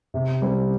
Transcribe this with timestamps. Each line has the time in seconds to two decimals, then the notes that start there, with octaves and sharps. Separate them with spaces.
0.14 C3
0.42 G3 C4